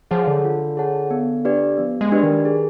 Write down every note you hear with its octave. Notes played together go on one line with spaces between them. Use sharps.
F3 G#4 C#5 F#5 A5
D3
F4
G#4 C#5 F#5 A5
B3
D4 G4 B4 D5
F3 B3
G#3
D4 G4 B4 D5
D#3
G#4